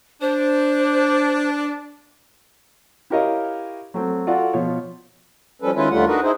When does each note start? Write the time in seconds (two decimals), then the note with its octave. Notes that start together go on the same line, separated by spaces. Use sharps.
0.21 D4 C5
3.10 E4 G4 A#4 C#5 D#5 F5
3.94 F#3 A3 C4
4.27 F4 F#4 A4 D5 F#5
4.53 B2 F3 F4 C#5
5.62 F3 G3 C#4 A4 B4
5.75 D#3 G#3 C#4 E4 F4 B4
5.90 D#2 D3 G3 A3 F4 F#5
6.07 D4 D#4 F#4 A#4 B4
6.23 D#4 E4 G#4 C5